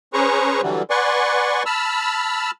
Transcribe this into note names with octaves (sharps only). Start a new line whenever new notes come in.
C#4 G#4 B4 C5 A#5 C#6
D3 E3 F#3 G3
B4 D5 F#5 G#5 C6 C#6
A5 B5 E6 F6